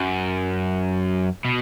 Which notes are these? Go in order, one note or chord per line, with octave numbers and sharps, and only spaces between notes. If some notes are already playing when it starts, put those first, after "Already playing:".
Already playing: F#2
B2